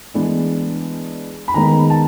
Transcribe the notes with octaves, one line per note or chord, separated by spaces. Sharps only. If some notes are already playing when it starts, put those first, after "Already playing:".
E3 G#3 B3 D4
B5
D#3 G#3 B3 A#5
A5